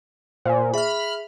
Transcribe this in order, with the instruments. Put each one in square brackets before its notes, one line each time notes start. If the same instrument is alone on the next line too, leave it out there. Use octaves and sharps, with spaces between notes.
[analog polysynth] A#2 [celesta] C5 G#5
[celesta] G#4 E5 [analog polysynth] B5 F6